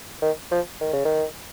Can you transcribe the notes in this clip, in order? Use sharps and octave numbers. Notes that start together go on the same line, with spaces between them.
D#3
F3
D#3
C#3
D#3